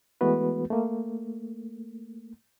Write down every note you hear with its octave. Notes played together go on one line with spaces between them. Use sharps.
E3 G#3 A3 B3 F#4 B4
A3 A#3